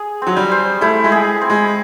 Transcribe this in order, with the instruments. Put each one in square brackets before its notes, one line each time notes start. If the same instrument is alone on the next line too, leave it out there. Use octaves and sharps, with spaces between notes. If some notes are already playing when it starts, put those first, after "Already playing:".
Already playing: [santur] G#4
[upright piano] F#3 [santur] C4
[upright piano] G3
[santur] C5
[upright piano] A3 [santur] E4
[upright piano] G#3
[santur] G#4
C4
[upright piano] G#3